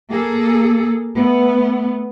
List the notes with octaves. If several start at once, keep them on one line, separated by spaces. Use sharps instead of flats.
A#3 G#4 A4
A3 B3